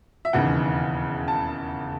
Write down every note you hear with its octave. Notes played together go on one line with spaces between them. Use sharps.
E5
E1 D#2 C#3 E3 F#5
A5